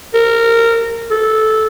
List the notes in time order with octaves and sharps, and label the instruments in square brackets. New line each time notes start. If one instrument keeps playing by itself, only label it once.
[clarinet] A#4
A4